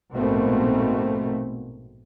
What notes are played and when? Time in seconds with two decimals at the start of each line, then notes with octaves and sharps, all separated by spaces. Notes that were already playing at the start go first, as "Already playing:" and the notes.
0.13 A#1 G#2 B2 A3 A#3 C4